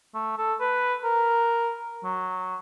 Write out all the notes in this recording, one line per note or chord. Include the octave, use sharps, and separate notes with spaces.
A3
A4
B4
A#4
F#3